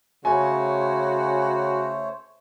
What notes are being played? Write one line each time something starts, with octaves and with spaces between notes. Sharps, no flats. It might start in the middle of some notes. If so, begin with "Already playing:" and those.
C#3 A3 F#4 C5 C#5 G#5